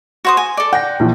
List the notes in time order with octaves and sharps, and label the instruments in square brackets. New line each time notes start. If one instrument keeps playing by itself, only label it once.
[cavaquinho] F#4 C5 D#6
G#5
A4 D5
[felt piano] F#5 A#6 [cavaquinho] G5
[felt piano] A#1 E3 F3